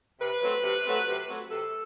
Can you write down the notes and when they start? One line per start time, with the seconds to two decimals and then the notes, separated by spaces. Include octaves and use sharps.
0.20 C3 B4
0.42 F#3 A3 C4
0.63 C3
0.85 F#3 A3 C4
1.07 C3
1.28 F#3 A3 C4
1.50 C3 A4